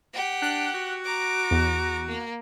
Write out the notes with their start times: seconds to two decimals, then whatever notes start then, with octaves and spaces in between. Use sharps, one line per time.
0.13 G4 F#5
0.42 D4 F#6
0.75 F#4
1.05 A#5 D6
1.51 E2
2.08 A#3